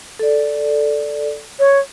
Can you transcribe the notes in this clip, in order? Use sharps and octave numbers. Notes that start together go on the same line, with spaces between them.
A4 D5
C#5